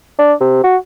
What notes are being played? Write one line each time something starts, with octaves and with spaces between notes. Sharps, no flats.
D4
C3
F#4